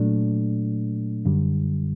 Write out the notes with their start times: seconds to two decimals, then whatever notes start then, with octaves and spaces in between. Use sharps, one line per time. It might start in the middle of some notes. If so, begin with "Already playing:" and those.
Already playing: A#2 F#3 A3 D4
1.25 F#2 D3 G3